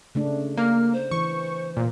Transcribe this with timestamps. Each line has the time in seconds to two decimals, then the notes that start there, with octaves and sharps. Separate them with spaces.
0.15 C#3 A3 D4
0.57 A#3 F6
0.93 C5
1.11 E3 C#6
1.77 A#2